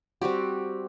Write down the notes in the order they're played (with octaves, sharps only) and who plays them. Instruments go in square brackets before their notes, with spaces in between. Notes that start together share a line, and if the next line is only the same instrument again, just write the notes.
[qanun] G3 C4 F#4 G4